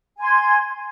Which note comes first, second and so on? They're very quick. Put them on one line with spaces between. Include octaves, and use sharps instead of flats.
G#5 C6 G#6